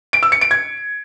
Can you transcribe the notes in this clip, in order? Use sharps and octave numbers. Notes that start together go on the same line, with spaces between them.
D7
E6
C#7
D7
G#6